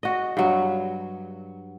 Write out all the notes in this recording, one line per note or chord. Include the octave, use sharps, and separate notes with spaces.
F#4 D#5
G2 F#3